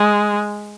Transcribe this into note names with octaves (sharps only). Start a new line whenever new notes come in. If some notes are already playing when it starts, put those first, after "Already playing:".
Already playing: G#3